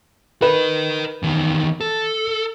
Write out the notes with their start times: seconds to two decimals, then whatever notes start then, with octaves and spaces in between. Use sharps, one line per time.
0.42 A#4 B4 D#5
1.23 E2 D#3
1.81 A4